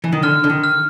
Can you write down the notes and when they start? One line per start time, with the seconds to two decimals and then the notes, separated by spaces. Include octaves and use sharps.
0.04 E3
0.13 D#3
0.23 D3 F6
0.44 D3
0.50 D#3
0.64 F6